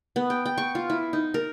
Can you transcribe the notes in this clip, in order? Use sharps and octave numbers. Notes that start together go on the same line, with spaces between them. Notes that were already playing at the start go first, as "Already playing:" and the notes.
B3
G5
G5
C#6
F4
E4
D#4
A#4